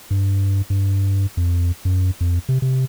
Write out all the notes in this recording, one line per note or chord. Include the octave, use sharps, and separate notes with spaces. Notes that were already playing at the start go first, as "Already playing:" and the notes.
G2
G2
F2
F#2
F2
C3
C3